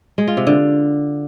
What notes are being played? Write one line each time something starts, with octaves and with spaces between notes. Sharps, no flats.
G#3
F4
C3
D3